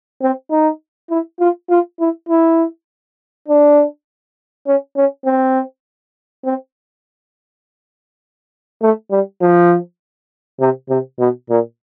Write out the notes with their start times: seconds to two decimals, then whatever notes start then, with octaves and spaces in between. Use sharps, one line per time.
0.22 C4
0.51 D#4
1.10 E4
1.40 F4
1.70 F4
2.00 E4
2.29 E4
3.48 D4
4.67 C#4
4.97 C#4
5.25 C4
6.45 C4
8.82 A3
9.11 G3
9.41 F3
10.60 C3
10.89 C3
11.19 B2
11.50 A#2